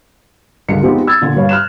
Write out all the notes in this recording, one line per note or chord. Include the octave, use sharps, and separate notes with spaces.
C#2 G2 D3 A#4 C#7
F3 G#3 B3 C4 D#4 G4
E6 G#6 A6
A#2 D3
G2 B4 C#5 F5
F6 F#6 E7